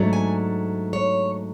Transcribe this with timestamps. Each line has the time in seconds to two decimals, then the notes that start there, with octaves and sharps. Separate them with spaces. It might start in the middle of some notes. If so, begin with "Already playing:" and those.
Already playing: G#2 F#3 A3 D4
0.13 G#5
0.93 C#5